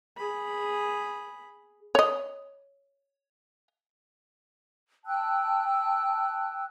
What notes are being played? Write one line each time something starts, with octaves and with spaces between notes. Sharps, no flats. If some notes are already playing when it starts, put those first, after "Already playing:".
G#4 B5
C#5 D#5
G5 A5 E6 F#6